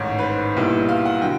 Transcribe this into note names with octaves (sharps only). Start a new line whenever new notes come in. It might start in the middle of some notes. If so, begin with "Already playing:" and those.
Already playing: A1 G#2 D#3 C#5
B4
C5
B1 A#2 G3 B3 E4
F5
F#5
D3 F#3 G5